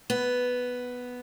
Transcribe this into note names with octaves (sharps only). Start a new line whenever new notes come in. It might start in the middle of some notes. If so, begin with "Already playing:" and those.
B3